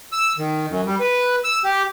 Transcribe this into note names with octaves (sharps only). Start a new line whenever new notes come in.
E6
D#3
F#2
G3
B4
E6
G4